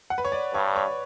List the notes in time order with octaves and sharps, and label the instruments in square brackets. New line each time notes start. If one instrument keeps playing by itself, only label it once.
[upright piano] F#5
B4
C#5
D5
[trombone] G2 [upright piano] C#5
[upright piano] C#5